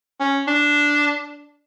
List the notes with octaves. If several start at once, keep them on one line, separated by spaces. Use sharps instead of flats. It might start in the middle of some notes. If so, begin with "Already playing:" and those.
C#4
D4